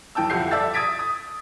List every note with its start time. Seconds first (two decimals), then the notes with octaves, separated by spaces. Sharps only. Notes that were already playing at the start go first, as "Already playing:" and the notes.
0.15 B1 E3 G5 A5 E6
0.30 G1 F2 G4 F#5 G6 C7
0.51 A4 D5 E5 A5 E6 A6
0.74 D#6 G#6 A6 B6 D7
0.99 D#6